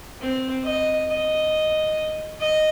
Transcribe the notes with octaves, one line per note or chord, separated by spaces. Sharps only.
C4
D#5
D#5
D#5